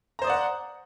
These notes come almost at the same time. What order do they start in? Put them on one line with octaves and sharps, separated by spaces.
A#5 C5 D#6 D5 F#5